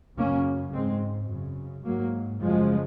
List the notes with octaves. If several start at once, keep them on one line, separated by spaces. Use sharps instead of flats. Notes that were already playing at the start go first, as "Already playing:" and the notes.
F#2 C#3 A#3 C#4
G#2 G#3 C4
F#2 C#3
G#2 F#3 A#3
F#2 C#3 F3 G#3